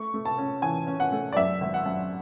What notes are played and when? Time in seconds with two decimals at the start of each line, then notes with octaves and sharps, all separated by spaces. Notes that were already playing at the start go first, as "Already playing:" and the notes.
Already playing: A3 C#6
0.14 A3
0.25 A5
0.38 C#4
0.62 E3 G#5
0.87 C#4
1.00 F#5
1.12 A3
1.33 D5
1.36 F#2 E5
1.61 G#1
1.74 F#5
1.86 F#2